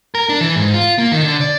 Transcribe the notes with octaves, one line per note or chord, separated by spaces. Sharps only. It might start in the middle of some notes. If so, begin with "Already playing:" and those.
A#4
D4
E3
G#2
F4
A#3
D#3
D3
D5